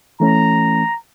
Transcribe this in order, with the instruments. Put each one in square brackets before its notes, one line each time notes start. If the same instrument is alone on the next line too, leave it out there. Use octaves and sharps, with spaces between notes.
[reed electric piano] E3 A3 C#4 [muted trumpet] A#5